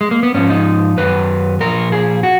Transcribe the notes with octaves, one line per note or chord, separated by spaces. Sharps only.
G#3
A#3
B3
G#2 F3 C#4
D#4
F#2 D#3 F#3 B4
A#2 F3 A#4
G#4
F#4